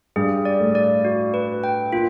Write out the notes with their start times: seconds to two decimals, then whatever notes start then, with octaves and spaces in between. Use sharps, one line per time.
0.16 G2 G3 G#4
0.45 D5
0.60 A2 A3
0.75 D5
1.05 F#4
1.34 B4
1.64 G5
1.93 A#2 A#3 F4